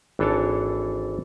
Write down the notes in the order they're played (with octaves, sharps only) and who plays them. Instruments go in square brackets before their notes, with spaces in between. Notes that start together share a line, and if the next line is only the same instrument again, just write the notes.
[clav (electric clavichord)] G#1 E3 D4 A4 C#5 A5